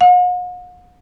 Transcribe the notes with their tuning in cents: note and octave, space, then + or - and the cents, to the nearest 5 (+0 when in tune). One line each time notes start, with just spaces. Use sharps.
F#5 -45